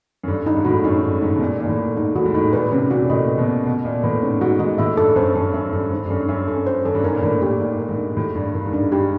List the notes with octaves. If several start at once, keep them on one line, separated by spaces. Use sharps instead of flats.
F#2
G2 A4
G2 D#4
G#2
A2 F#4
F#2 D#4
G2 A4
G#2 D#4
B2
A#2 F#4
A#2 D#4
A2
A4
G#2 D#4
A2 F#4
G#2
A2 D#4
A#2 B4
C3 C#4
A#2 F#4
A#2
A2 D#5
B4
B2
C#4
B2 F#4
A#2 D#5
A2 B4
G#2 C#4
G#2 F#4
G#2 D#5
A2 E5
G2 A4
F#2 C5
F#2 A4
F#2 E5
G2 A4
G#2 C5
G2
F#2 A4
F#2 E5
A4
F#2
C5
F#2 A4
G2
G#2 A#4
A#2
A2 D4
A#2 G4
G#2 D5
A#4
G#2
D4
A2 G4
G2 D5
G2 A#4
G#2
G2 D4
G2 G4